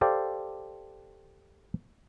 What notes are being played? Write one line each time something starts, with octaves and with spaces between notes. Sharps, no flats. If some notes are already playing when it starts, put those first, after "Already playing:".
G4 A4 C5 D5 F5 G5